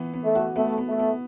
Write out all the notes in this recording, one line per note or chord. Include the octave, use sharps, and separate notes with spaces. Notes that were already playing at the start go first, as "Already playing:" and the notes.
Already playing: E3 B3
B3
A3
F#4
A3 B3
B3
A3
B3